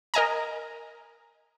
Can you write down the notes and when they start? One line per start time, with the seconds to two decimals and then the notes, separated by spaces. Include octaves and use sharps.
0.14 A#4 D#5 G#5 A#5